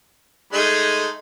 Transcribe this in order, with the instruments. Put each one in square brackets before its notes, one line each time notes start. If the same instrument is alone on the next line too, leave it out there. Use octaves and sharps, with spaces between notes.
[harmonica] G#3 A3 D#4